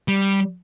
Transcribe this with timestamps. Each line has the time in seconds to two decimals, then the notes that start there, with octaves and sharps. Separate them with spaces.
0.08 G3